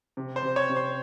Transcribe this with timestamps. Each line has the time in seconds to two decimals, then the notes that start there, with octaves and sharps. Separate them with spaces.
0.17 C3
0.36 C5
0.43 C3
0.56 C#5
0.69 C3
0.76 C5